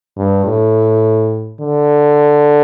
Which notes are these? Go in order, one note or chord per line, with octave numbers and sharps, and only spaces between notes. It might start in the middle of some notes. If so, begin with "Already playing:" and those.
G2
A2
D3